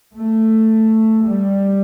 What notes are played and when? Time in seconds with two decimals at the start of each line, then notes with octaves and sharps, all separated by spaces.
0.17 A3
1.26 G3